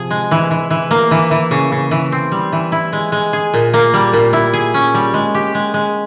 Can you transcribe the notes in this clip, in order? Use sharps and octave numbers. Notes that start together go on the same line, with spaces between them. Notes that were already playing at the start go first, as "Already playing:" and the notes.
Already playing: C3 F3 G#4
G#3
E3
E3
E3
A#3
E3
E3
C#3
C#3
E3
C4
G3
E3
E4
G#3
G#3
G#4
A#2
A#3
G3
A#2
E4
G#4
C#4
G3
G#3
G4
G#3
G#3